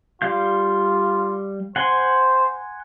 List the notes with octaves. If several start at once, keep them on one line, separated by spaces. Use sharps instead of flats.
G3 F4 F5 G6
C5 F#5 G#5 C6